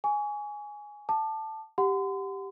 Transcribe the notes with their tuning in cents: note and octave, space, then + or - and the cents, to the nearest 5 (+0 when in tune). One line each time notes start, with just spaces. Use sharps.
G#5 +0 C#6 +40
F#5 +15 A5 +0 D6 +35
G4 +0 F#5 -5 C6 -40